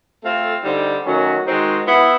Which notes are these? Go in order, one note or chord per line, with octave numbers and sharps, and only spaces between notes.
A3 C4 F4 A4
D3 G3 C4 D#4
D#3 F#3 A3 C#4 F#4
D#3 G#3 C4 D#4 F#4
B3 E4